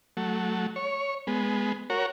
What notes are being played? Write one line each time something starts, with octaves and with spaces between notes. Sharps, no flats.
F#3 A3
C#5
G#3 B3
F#4 A#4 C#5